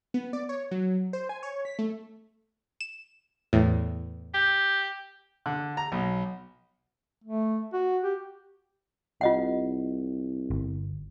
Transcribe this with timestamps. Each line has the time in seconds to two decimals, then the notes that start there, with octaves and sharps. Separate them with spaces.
0.14 B3
0.33 D5
0.49 C#5
0.71 F#3
1.13 C5
1.29 G#5
1.43 C#5
1.65 B6
1.79 A3
2.81 E7
3.53 E2 A2
4.34 G4
5.46 D3
5.77 A#5
5.92 B1
7.24 A3
7.73 F#4
8.04 G4
9.21 C2 F4 D#5 F#5
10.50 G1